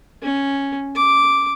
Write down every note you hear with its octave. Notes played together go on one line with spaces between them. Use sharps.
C#4
D6